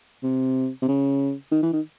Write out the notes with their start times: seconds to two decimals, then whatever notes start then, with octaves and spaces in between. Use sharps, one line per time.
0.23 C3
0.82 C3
0.88 C#3
1.52 D#3
1.63 E3
1.73 D#3